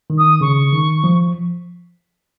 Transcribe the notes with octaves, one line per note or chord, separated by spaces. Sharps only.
D#3
D#6
C#3 C#6
D#3
F3